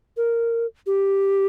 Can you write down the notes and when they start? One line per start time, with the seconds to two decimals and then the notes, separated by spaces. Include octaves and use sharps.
0.17 A#4
0.86 G4